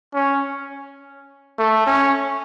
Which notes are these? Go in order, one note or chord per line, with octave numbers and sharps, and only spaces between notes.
C#4
A3
C#4